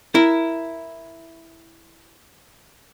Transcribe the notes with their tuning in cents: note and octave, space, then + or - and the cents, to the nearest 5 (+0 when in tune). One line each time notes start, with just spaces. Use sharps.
E4 +0 A#4 +0